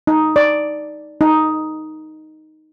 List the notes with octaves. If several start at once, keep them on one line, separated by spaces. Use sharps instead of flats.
D#4
D5
D#4